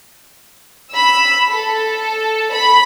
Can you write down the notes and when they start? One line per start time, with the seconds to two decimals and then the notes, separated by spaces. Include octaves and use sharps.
0.92 B5 E6
1.50 A4
2.54 B5